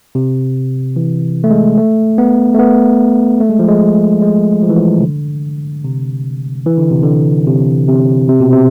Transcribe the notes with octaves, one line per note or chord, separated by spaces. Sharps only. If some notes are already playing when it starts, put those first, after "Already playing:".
C3
E3
A3
G#3
A3
B3
A3
B3
A3
G#3
F3
G#3
G#3
F3
E3
F3
C3
D3
C3
E3
D3
C3
D3
C3
C3
C3
B2
C3